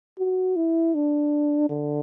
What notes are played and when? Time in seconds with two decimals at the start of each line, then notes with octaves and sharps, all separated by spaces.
0.19 F#4
0.56 E4
0.94 D4
1.69 D3